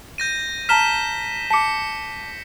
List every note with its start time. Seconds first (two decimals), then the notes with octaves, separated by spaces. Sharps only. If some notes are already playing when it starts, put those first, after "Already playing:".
0.18 G6 A#6 D#7
0.69 A5 A#5 F6 B6 E7 G7
1.50 A5 D6 B6 C#7